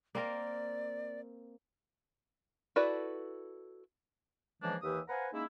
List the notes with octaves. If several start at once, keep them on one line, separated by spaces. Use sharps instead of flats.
A#3 C4 A#4 D5
E4 F#4 A4 B4 D5
C#3 E3 F3 G#3 A#3 D4
D#2 E3 G4 B4 E5 D#6
B4 C5 F5 F#5 G#5 A#5
G#3 A#3 C#4 D#4 E4